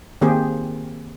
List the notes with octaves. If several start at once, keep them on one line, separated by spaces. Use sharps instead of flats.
D#3 A#3 C4 G4 G#4